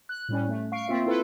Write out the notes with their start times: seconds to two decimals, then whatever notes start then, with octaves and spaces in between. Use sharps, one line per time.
0.09 F#6
0.29 A2 G3 C#4
0.49 A3
0.72 F5 C#6 C7 D7
0.88 A#3 C4 F4 E5
1.06 E4 F4 A4 B4